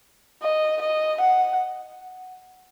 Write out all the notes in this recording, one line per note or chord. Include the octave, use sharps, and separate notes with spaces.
D#5
D#5
F#5